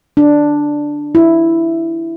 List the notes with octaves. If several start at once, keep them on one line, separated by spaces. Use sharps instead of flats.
D4
E4